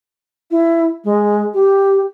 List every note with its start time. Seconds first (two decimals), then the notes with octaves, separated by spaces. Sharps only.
0.51 E4
1.04 G#3
1.54 G4